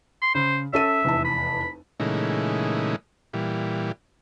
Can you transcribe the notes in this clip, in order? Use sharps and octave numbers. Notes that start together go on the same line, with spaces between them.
C6
C#3 C5
C#4 A4 E5 D#7
F1 E2 A5
B5
A#2 C#3 E3 G#3 A3 D#4
A#2 E3 G3